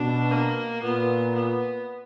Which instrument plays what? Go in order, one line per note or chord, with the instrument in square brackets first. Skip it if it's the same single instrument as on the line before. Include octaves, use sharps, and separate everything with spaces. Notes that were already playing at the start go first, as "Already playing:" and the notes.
Already playing: [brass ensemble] B2 [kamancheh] D4
[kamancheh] A#3
[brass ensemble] A#2 [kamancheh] B3
[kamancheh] B3